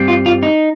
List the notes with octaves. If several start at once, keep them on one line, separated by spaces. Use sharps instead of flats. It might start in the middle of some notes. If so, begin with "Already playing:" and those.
Already playing: G2 G3 C4
F4
F4
D#4